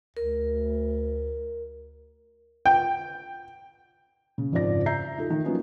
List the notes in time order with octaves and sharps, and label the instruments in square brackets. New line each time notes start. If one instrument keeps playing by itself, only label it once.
[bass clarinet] D2 [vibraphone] A#4
[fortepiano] G5
[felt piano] C#3
F#1 F2 G#2 F3 D5 A#6
E5 A#5 G6 C7
D#4 F4 A4
D#3
F3 F#3 A#3 B3 C#4 D#4